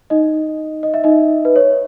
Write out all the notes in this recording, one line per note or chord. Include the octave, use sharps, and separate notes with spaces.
D#4 D#5
D#5
E5
D#4 D#5
B4
C#5